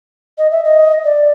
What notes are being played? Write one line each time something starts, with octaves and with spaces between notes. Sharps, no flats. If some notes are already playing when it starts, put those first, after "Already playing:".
D#5
E5
D#5
D5